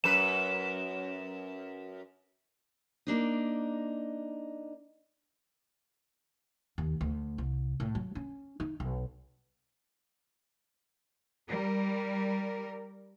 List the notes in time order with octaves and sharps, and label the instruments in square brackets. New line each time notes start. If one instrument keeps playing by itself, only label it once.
[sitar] F#2 B4 [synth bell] E7
[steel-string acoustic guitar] A#3 D4 D#4
[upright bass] D#2
D2
C2
A2
F#3
C#4
D#4
B1
[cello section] G3 A#4